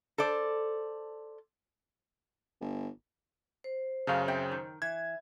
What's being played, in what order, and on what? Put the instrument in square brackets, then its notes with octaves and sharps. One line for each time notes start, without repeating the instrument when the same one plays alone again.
[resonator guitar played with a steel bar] A4 C5 D5
[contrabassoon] G1
[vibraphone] C5
[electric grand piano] F#2 C#3 [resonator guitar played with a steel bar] A3 C#5 F5
[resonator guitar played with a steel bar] C4 E5 G5
D#3
[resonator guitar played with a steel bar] E3 [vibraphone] E5 [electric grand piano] G#6